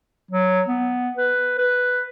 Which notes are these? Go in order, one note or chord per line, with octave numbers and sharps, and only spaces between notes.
F#3
B3
B4
B4